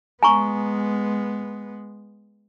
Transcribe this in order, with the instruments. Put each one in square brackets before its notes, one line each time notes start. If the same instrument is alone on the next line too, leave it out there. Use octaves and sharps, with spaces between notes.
[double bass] G#3 B3 [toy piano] G#5 A#5 C#6